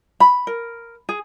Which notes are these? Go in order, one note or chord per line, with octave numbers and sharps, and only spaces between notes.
B5
A#4
G#4